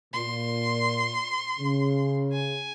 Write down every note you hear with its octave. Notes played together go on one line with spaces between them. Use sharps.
A#2 C6
C#3
G#5